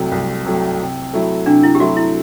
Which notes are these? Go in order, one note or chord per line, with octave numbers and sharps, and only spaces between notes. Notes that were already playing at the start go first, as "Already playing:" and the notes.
Already playing: C2 C3 F#3 A3
C2
C3 F#3 A3
C3
F#3 A3 E4
C3 D4
E4
G4
F#3 A3 E4 F#4
E4